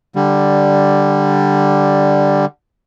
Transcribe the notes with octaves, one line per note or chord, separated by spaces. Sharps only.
D3 G3